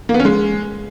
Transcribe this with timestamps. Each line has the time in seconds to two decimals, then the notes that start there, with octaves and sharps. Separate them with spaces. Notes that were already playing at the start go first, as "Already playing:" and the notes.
0.09 A#3
0.14 B3
0.20 C#4
0.25 G#3